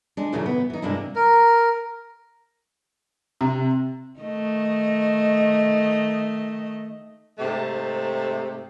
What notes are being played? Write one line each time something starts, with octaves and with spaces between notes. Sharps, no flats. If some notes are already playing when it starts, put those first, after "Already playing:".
G#3 D4
D#2 A#2 C#3 E3 F#3 A3
B3
E3 D#4
G2 C3 G#3 A#3 D4 E4
A#4
C3
D#3 A3 D#5
G#2 C3 A3